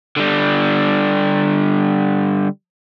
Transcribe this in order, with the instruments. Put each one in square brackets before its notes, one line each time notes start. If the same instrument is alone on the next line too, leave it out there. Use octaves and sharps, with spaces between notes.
[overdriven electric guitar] D3 G3